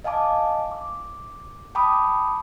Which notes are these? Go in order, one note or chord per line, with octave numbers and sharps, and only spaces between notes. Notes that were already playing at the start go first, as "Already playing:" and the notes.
D#5 F5 G#5 A5 D6
D6
G5 A5 B5 D6 D#6